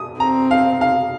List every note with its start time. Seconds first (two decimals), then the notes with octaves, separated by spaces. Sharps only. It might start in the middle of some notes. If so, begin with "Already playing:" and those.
Already playing: D#6
0.19 C4 A#5
0.51 F5
0.81 F5